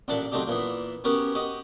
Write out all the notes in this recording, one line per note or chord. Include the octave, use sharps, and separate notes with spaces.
A1 A#2 D4 F#5 A5
F#3 A3 C4 D4 D#4 G4
A#2 E3 B3
B3 C#4 F#4 G4 A#4 B4
F#4 G4 D#5